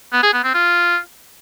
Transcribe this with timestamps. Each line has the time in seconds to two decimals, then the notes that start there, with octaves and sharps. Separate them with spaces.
0.12 B3
0.23 G#4
0.33 B3
0.43 C4
0.54 F4